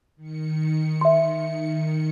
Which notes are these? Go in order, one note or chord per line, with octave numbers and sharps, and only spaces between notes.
D#3 C#7
E5 C6